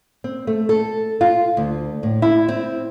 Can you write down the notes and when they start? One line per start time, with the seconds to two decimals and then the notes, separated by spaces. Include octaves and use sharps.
0.24 C4
0.47 A3
0.69 A4
1.21 F4
1.57 D2
2.03 A2
2.22 E4
2.49 C4